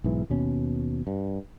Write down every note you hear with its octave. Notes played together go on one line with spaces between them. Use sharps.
B1 G#2 E3
D#2 B2 C#4
G2